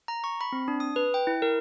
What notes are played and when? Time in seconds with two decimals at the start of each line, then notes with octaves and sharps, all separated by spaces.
0.08 A#5
0.24 C#6
0.41 B5
0.52 C4
0.68 D4
0.80 D#6
0.96 B4
1.14 G5
1.27 E4
1.42 A#4